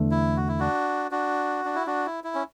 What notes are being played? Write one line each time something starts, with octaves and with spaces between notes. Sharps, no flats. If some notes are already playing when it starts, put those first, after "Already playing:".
Already playing: E2 D3 A3
E4
F#4
E4
D4 F#4
D4 F#4
D4
E4
D4 F#4
E4
E4
C#4